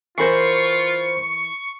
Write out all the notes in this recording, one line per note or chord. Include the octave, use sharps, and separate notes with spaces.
E3 F4 A#4 C5 B5 C#6 C7